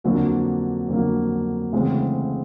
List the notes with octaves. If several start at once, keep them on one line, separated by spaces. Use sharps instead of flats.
F2 D3 F#3 A#3
F2 D3 F#3 A#3
D2 C#3 E3 G#3 C4